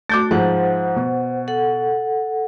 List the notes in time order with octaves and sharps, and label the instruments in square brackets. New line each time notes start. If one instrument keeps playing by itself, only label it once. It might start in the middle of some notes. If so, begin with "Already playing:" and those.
[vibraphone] A3 F#4 [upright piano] D6 G6 A6
[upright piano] G#2 F3 [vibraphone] C5 F#5
[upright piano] B2
[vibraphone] A4 F#5